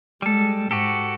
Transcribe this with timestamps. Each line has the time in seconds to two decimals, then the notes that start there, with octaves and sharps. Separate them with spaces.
0.22 G3 G#3 A4
0.71 G#2 F#4 G4 A4